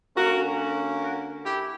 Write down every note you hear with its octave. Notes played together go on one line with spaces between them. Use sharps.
D3 A#3 C#4 F#4 A#4
F#4 A#4
E4 G4